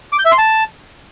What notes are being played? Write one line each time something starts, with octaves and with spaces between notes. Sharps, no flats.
D6
G6
E5
C6
A5